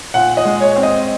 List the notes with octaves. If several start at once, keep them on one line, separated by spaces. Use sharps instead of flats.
A#2 F#5
D#5
G#3
C#5
C4
D#5